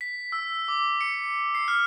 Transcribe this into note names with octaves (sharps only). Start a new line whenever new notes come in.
B6
E6
D6
C#7
C7
F6